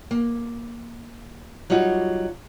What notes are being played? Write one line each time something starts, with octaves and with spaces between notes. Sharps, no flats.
A#3
F#3 G3 D#4 F4 F#4